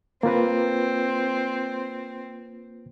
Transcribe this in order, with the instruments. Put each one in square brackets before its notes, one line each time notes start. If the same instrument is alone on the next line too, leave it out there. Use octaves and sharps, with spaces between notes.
[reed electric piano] A#3 F4 B4 [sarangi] C4